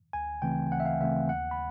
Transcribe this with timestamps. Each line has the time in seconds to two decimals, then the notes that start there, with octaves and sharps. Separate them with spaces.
0.13 D2 G#5
0.42 C#3 E3 A3 C4 G5
0.71 D2 F#5
0.80 E5
0.85 F5
1.01 C#3 E3 A3 C4 E5
1.29 D#2 F#5
1.51 B5